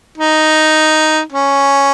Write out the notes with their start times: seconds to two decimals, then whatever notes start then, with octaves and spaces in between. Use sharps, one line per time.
0.18 D#4
1.32 C#4